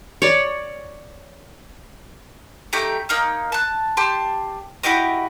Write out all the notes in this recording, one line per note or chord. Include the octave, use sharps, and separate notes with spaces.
C#5 D5
A3 D#4 G4 G5
A#3 D#4 F6
A5 F#6
G4 A5 C6
E4 F#4 G4 D#5